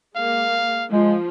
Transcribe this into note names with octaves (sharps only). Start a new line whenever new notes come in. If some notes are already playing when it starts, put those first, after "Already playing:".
G#3 A#3 F5
F3 G#3